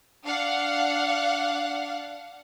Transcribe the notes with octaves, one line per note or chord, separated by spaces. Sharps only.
D4 F5 F#5